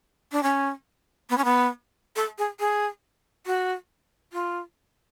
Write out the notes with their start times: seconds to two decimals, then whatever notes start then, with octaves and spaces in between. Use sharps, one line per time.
0.32 D4
0.43 C#4
1.30 B3
1.37 C#4
1.45 B3
2.16 A4
2.38 G#4
2.60 G#4
3.46 F#4
4.33 F4